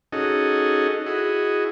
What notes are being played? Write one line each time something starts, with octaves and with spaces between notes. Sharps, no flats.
C#4 D#4 F#4 G#4 A4 D#5
E4 F#4 G#4 D#5